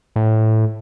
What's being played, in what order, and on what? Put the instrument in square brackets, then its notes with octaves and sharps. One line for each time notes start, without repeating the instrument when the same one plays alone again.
[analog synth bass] A2